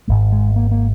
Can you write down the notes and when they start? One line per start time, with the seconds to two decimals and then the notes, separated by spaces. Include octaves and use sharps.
0.08 G#1 G#2 G#3
0.32 G#3
0.56 A#3
0.72 A#3